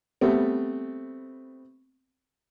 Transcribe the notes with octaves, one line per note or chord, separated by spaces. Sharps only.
G3 A3 B3 C4